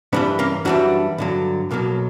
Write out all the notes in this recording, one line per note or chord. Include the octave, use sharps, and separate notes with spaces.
G2 E3 G3 B3 D4
A#3 C#4
F#2 E3 G3 D4 F#4
G2 D3 F#3
B1 B2 F#3 A#3